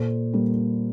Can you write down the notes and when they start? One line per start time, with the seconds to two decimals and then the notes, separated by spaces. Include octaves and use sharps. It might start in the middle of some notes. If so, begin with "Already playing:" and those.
Already playing: A#2 A4 C5
0.33 G3 A#3